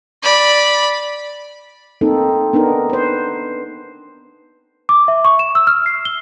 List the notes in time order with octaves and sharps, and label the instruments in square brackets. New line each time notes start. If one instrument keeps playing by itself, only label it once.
[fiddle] D5 B5
[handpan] A#3 C4 D#4 A4
B3 D4 D#4 A#4
B4 C5
[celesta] D6
E5
C#6
E7
E6
F6
C7
G7